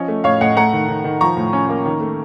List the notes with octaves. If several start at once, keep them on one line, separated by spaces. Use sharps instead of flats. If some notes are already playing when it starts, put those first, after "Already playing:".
Already playing: F3 C#4 D#5
A3
A2 C#5 F5
A2 D#5 F#5
A3 F#5 A#5
D#3
D#3
D#3
F3 A#5 C#6
A2
C#4
A#3
D#3
A3